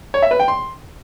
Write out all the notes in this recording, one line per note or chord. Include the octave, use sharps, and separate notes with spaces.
C#5
E5
B4
G5
C6